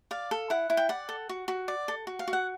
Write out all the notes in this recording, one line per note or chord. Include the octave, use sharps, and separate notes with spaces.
D5 F5
A4
E4 F#5
E4
G5
D5 F#5
A4
F#4
F#4
D5
A4
F#4
F5
F#4
F#5